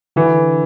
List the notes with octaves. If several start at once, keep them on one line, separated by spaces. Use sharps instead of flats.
D3 E3